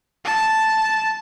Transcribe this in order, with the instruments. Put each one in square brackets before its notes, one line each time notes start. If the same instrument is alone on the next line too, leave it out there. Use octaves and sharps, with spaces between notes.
[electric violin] A5